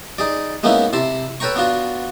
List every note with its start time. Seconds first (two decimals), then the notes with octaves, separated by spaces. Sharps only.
0.18 D#4 G#4 D5
0.63 G#3 A#3 B3 C#4 D#4 E4
0.93 C3 E4 A5 C6
1.40 A4 B4 C#5 G5 A#5 C#6
1.55 B3 D4 F4 F#4